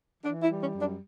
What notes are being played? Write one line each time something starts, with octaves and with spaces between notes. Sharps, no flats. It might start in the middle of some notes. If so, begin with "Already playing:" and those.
E3 D4
E4
G3
C#4
F#2
D4